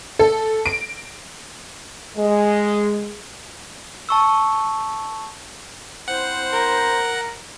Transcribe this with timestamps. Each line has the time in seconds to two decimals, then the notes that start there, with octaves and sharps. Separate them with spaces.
0.19 A4
0.66 D7
2.17 G#3
4.09 A5 C#6 E6
6.08 C4 E4 C5 F#5
6.53 A#4 A#5